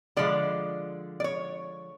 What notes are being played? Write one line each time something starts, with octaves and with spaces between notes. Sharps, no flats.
D3 F3 G#3 D5
D5
C#5